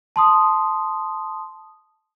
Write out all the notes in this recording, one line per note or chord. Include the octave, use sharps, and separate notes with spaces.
A5 C6 D#6